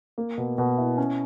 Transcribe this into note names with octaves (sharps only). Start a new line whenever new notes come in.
A#3
B2
B2
E4
C#4